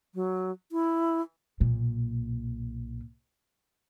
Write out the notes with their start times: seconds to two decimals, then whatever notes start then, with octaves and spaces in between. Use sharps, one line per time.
0.15 F#3
0.72 E4
1.60 B1 A#2